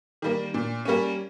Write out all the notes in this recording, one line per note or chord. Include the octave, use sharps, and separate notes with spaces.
D#3 G3 A#3
A#2
G3 A#3 C#4